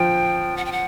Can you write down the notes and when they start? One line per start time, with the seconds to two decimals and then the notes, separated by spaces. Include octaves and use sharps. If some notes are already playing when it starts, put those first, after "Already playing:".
Already playing: F3 G5
0.57 F#5
0.65 G5
0.72 F#5